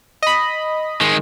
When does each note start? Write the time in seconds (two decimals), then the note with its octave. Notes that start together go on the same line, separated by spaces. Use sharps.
0.22 D#5 B5
1.01 D#3 G#3